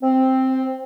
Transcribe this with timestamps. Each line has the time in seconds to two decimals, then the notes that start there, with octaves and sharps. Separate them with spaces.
0.01 C4